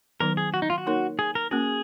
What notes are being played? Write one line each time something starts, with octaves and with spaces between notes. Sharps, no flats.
D#3 F#3 B3 D#4 A#4
G#4
F#4
D#4
F4
F#4
A#3 D#4 A#4 C#5
G#4
A#4
A#3 C#4 F#4 G#4 A#4